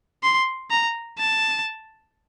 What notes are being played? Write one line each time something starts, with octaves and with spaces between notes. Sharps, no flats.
C6
A#5
A5